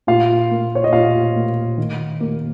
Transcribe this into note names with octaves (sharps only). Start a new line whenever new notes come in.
A#2 F4 F5
A#3
C#5
D#5
A#2 F4 F5
A#3
D#3
A#3